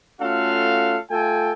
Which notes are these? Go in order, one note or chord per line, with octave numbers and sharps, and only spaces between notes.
A3 C#4 F4 F#4 A4 F5
A3 F4 A4 G5 G#5